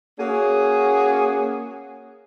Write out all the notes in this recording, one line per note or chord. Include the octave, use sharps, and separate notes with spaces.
A#3 C#4 F#4 G#4